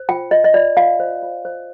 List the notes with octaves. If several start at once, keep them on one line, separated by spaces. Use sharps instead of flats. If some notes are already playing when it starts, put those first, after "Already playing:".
Already playing: C5
F4 G5
F4 D#5
D#5
F4 D5
F4 F5
C5
F4
C5